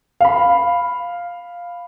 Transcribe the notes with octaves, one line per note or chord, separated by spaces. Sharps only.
F5 B5